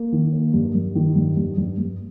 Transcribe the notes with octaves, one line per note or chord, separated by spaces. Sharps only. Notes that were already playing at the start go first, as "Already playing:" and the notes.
Already playing: A#3
D#3
A#3
G2
G2
D#3
G2
G2
G2
G2